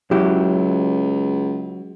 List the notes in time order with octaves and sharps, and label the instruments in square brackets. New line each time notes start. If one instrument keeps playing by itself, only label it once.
[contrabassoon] C#2 [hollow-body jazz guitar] F#3 E4 G4